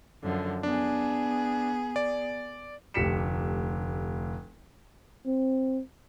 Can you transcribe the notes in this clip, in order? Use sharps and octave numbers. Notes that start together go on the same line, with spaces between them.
F#2 D3 F3
B3 D4 G#4
D5
F1 D2 G4 B6 C#7 E7
C4